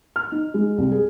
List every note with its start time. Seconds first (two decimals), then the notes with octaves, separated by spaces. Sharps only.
0.16 F6
0.32 D#4
0.54 G#3
0.78 C2
0.92 G#4